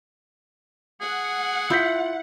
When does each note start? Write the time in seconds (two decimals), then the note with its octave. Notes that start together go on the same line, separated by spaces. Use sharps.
1.01 G#4 F#5
1.70 E4 F4 G6 B6